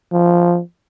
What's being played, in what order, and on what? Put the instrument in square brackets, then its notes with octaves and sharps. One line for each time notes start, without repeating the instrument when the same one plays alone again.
[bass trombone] F3